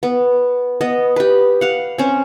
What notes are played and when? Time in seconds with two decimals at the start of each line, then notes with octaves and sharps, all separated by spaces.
0.03 B3
0.81 B3 D#5
1.16 G4 B4
1.61 F5 F#5
1.98 C4 C#4